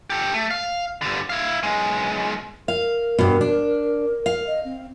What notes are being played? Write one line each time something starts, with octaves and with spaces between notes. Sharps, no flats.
G4 A4
A3
F5
G2 D3
E4 F5
B1 G#3
A#4 F5
G2 B2
D4
F5
D#5
C4